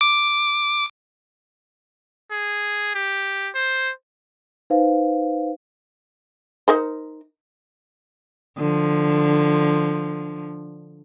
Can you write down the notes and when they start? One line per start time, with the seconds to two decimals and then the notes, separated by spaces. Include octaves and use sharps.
0.01 D6
2.31 G#4
2.95 G4
3.55 C5
4.70 D#4 B4 C5 F5
6.68 D#4 A#4 C5
8.58 D3 F3